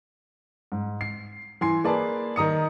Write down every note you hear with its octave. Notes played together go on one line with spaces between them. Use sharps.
G#2
C7
E3 G#5 C6 C7
A#3 G#4 B4 D5 A5
D#3 A#5 D#6 C#7